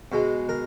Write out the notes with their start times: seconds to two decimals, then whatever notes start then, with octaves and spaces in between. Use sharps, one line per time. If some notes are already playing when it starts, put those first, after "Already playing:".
0.12 B2 G#3
0.49 A#4